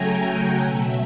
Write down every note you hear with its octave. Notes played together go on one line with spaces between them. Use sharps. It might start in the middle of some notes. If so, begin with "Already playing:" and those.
Already playing: C#3 F#3 A3 G5 G#5 A#5
F#5
B2 F#3 A3 E5